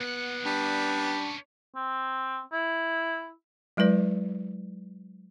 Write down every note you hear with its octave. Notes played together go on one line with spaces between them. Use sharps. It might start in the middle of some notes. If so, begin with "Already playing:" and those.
D#2 B3 F#5
G3 C#4 D4 B4
C4
E4
F#3 G#3 E4 B4 D5